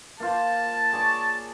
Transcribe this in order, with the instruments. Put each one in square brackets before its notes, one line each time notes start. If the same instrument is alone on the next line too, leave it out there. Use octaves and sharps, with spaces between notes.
[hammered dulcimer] A#3 F4 C5 [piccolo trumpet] A5
[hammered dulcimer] G#4 C#5 D5